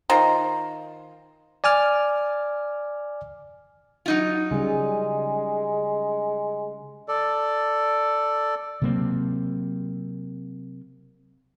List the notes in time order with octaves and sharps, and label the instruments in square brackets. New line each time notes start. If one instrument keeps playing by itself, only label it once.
[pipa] D#3 F4 C5 A#5
[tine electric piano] D5 G#5 D6 F6
[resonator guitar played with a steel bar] F#3 D#4 F4
[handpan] C#3 G3 G#4 [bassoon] G#3
[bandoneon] A4 D5
[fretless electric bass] C3 F#3 A#3 C4